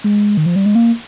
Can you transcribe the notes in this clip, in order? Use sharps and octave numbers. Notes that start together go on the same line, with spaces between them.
G#3
D#3
F3
G3
G#3
A#3